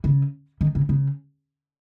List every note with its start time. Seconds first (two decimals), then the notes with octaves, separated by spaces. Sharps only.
0.04 C#3
0.61 D#3
0.75 C#3
0.89 C#3